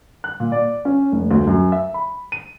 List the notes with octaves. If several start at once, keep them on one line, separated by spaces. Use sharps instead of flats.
F#6
A#2
D5
C#4
F1
D2
F#2
E5
B5
D#7